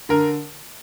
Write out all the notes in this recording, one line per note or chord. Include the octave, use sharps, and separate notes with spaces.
D3 A#4